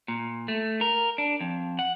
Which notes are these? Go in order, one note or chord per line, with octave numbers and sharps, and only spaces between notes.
A#2
A3
A#4
D4
F2
F#5